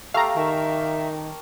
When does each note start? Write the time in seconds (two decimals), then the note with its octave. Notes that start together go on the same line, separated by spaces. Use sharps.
0.14 A3 G4 F5 A#5
0.36 D#3 A#4 E5 A5 C#6